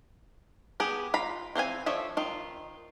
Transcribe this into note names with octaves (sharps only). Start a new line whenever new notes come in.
B3 G4 G#4
F4 A#5 B5
E3 C4 F5 G#5
F3 D4 A4 C#5 E5
D#3 F4